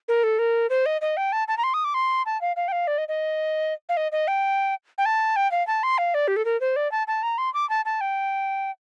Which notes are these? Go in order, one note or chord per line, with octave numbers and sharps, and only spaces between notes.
A#4
A4
A#4
C5
D#5
D#5
G5
A5
A5
A#5
C6
D#6
D6
C6
A5
F5
F5
G5
F5
D5
D#5
D#5
F5
D#5
D#5
G5
G5
A5
G5
F5
A5
C6
F5
D5
G4
A4
A#4
C5
D5
A5
A5
A#5
C6
D6
A5
A5
G5